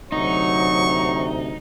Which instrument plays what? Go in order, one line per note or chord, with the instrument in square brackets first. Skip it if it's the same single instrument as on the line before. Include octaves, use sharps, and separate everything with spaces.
[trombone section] D2 C3 [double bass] F#3 [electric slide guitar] D#4 [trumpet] C#6